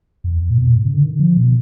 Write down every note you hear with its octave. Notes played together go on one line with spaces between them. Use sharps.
F2
E2
F2
A#2
B2
A#2
G#2
C#3
D3
D#3
D3
F3
B2